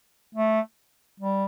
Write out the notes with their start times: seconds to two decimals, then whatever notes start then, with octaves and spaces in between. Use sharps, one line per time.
0.35 A3
1.20 G3